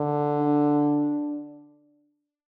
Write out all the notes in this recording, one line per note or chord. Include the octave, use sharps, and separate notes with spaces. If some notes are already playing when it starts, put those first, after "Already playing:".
Already playing: D3
D4